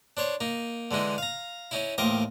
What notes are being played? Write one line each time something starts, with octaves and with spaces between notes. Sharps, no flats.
D4 C5 C#5
A#3 D#4
D3 E3 G#3 D#4
F5 A#5
C#4 D#4 E4
A1 D#2 A#4 C5 D#5 D6